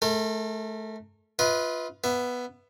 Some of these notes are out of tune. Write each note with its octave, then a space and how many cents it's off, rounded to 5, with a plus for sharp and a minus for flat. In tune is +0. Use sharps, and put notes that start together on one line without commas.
A3 -25 A#4 -45
F4 +0 B4 +0 D#5 +45
B3 +0 E5 +20